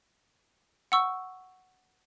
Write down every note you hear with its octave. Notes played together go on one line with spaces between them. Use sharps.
F#5 C#6 E6